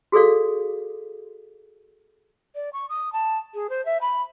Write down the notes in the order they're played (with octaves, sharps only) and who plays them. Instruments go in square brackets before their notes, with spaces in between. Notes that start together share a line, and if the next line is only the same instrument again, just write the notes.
[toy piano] F#4 G#4 A4 D5 F5
[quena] D5
C#6
D#6
A5
G#4
C5
E5
B5